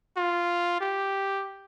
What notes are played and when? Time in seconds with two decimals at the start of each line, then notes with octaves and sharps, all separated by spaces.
0.17 F4
0.80 G4